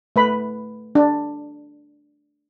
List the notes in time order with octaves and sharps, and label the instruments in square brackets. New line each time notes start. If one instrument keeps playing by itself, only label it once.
[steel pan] A3 B4 B5
D4